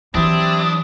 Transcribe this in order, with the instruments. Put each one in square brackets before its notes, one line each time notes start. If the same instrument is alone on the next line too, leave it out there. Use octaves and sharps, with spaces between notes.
[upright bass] E3 F#3 [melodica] C4 E4 G4 [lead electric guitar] D4 [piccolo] D#6